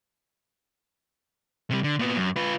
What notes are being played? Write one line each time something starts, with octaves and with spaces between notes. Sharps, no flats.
C3 G3
D3
A#2 B3
F#2
F4 B4